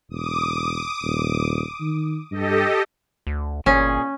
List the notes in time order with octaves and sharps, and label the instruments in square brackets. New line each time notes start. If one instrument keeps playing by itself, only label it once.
[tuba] E1 [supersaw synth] D6 D#6
[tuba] D#1
D#3
[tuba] G2 [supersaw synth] G4 A4 D#5
[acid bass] D2
[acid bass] G1 [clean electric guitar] A#2 G#4 [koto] C#4